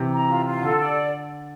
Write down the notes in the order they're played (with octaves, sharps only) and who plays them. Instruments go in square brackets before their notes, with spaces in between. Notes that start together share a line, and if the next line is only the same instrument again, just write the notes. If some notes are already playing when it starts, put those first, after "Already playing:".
Already playing: [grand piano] C3 E3
[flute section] A#5
F4
F4
[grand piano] D3 [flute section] A4
[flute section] D5